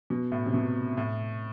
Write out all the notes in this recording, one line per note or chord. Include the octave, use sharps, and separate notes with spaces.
B2
A2
C3
B2
A2